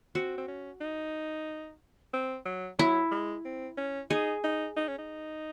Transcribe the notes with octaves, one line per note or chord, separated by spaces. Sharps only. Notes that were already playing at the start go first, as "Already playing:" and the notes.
C4 F#4
C4
C#4
D#4
C4
F#3
F#3 E4
G#3
C4
C#4
D#4 G#4
D#4
D#4
C#4
D#4